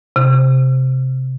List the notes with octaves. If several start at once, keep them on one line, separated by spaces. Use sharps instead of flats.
C3